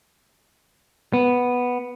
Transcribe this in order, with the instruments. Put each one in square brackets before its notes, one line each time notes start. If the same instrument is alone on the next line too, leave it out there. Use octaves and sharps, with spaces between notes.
[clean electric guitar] B3